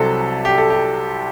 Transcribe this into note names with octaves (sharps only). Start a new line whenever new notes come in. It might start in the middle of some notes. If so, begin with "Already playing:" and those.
Already playing: C2 C3 F#3 A4
G4
A4
G4